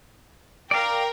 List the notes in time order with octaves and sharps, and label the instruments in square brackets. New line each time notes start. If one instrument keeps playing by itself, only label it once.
[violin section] A#4 G5 [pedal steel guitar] D5 F5